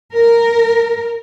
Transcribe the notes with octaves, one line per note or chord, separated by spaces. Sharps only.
A#4